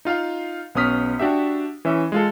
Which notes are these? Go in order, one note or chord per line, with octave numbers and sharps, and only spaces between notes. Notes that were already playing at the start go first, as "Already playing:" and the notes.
D#4 F4 F5
B1 B3 C#4 D#6 F6 B6
D4 F#4 G4 E5
E3 C#4 E5
G#3 F4 A4